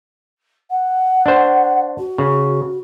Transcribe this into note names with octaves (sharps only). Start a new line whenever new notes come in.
F#5
D4 C5
F#4
C#3